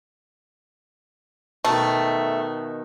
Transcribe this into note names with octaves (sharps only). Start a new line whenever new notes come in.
B2 D#3 A3